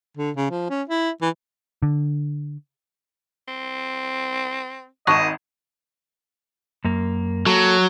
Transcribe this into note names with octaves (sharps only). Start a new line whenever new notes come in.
D3
C#3
F3
C#4
E4
E3
D3
C4
G#1 D#5 A5 C#6 F#6 E7
F#2 A#3
F#3 A#3 A4